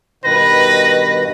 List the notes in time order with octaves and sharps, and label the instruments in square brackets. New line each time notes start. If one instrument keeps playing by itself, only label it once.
[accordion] G2 B2 D#3 [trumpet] B4 [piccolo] A#6